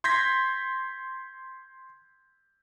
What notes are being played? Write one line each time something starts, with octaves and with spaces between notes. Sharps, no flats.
C6 G6 G#6 A#6 B6